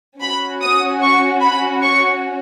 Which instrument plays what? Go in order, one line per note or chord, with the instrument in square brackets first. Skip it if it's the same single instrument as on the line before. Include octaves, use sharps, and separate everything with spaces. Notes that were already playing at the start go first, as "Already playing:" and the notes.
[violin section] C#4 F#4 B5
D#6
C#6
B5
C#6